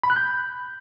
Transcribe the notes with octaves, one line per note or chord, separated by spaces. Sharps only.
B5
F#6
G6